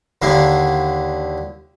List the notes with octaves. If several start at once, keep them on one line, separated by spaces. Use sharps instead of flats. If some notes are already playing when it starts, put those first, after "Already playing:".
D#2 D3 E4 F5